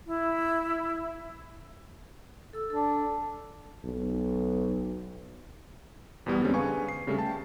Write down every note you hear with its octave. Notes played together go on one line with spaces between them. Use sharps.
E4
A4 E6
D4 A4
B1
E2 B2 G3 B3
D3 G3 G#3 C4 C#4
D3 G#4 B4 F5 G#5 C#6
C7
C#3 G3 A3
G5 A5